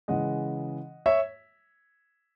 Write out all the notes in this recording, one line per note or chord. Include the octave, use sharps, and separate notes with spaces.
C#3 E3 G#3 D#5 F#5
C#5 E5